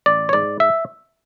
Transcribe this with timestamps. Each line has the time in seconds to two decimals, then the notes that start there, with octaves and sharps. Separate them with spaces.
0.06 A1 D5
0.29 C#5
0.33 G#2 D5
0.60 E5